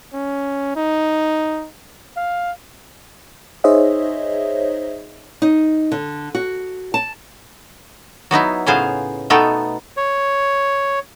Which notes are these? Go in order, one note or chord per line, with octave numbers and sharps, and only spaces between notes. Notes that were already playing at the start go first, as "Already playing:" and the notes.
C#4
D#4
F5
D#4 G#4 C5 C#5 D#5 E5
D#4
D3
F#4
A5
F#3 B3 D#4 E4
A2 C#3 B3 G#4 C5 F5
B2 A3 B3 D#4 A4 G5
C#5